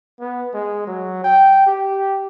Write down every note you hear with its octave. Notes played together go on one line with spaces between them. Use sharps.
B3
G#3
F#3
G5
G4